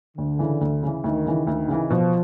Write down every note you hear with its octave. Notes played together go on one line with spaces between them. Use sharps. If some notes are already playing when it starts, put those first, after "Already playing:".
D2 D3
C#3 E3
D2
C#3 E3
D2 D#3
C#3 E3
D2 D#3
C#3 E3
B2 F3